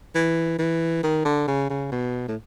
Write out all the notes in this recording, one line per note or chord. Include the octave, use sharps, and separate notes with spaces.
E3
E3
D#3
D3
C#3
C#3
B2
A2